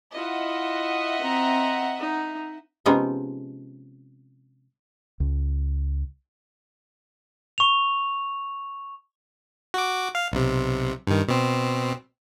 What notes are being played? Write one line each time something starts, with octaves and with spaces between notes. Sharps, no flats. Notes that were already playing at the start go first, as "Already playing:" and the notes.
E4 F4 D#5 E5 F#5
C4 A#5
D#4
C3 F3 G#3 B3 C#4 D#4
C#2
C#6 F7
F#4 D6
F5
B1 C3
G2 D#3
B2 C4